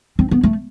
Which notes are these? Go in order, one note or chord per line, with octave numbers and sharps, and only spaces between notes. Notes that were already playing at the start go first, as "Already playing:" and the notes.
C4
B3
A3